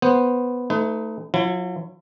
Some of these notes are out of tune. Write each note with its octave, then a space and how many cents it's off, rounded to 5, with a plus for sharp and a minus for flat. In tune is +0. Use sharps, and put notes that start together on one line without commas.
B3 +0 C5 +5
A3 +10 D#4 +20 B4 +45
F#3 -35 E4 +40